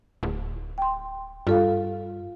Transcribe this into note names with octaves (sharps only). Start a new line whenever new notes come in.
D1
G5 C6
G2 F4 A4 F5